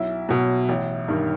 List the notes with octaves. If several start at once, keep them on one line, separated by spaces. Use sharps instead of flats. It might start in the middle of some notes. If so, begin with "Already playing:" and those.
Already playing: B1 E4
B2 F#3
A1
G2 D#3